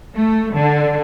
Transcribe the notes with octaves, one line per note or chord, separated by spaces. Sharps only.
A3
D3